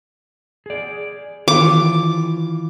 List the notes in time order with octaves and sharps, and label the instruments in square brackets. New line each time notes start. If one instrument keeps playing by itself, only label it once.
[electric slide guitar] G#4 D5
[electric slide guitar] D#3 E3 F4 [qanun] D6